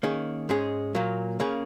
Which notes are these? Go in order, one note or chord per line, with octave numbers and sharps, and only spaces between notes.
D#3 A#3 C#4 G#4
G#2 G#3 C#4 G#4
A#2 F#3 A#3
C#3 A#3 C#4 G#4